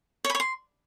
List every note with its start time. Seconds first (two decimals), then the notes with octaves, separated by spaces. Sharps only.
0.24 C#5
0.30 B5
0.35 C#5
0.40 C6